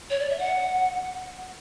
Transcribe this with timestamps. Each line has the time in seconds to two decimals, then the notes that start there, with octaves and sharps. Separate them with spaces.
0.10 C#5
0.20 D5
0.30 E5
0.39 F#5